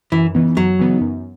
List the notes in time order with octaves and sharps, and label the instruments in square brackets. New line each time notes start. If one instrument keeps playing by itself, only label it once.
[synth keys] F#2 [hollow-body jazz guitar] E3
[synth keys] C#3 E3 B3 D#4
[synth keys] F#2 [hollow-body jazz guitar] F#3
[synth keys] C#3 E3 B3 D#4
F#2